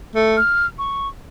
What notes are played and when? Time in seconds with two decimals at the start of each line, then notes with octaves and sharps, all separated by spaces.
0.15 A3
0.37 F6
0.78 C#6